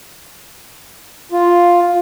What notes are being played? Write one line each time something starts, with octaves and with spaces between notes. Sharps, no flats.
F4